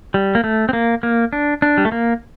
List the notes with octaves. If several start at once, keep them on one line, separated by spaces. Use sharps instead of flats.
G3
A#3
A3
C4
A#3
A#3
D4
D4
G3
A3
A#3